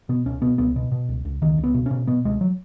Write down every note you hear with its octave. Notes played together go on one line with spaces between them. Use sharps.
B2 B3
C#2 C#4
B2 B3
C#2 B3
B2
B2
C#2
C#2
C#2 D#3
C#2
B3
B2
B2 C#4
B2 B3
C#2 G#3
F#3